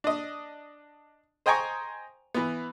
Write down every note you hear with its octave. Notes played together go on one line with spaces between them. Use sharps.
D4 D#5
C5 D#5 G5 G#5 A#5 C#6
E3 B3